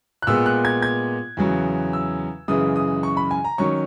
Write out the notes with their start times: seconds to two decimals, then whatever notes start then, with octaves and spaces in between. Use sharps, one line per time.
0.22 F#6
0.27 A#2 G#3 B3 E6
0.46 F#6
0.65 G#6
0.82 G#6
1.37 E2 C#3 F#3
1.93 E6
2.48 F#2 C#3 E3 G#3 D#6
2.76 D#6
3.03 C#6
3.17 B5
3.31 G#5
3.44 A#5
3.58 D#3 F#3 C#4 C#6